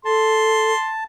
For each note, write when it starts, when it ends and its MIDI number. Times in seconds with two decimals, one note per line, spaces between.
0.05 0.73 69
0.05 1.04 81
0.05 0.91 84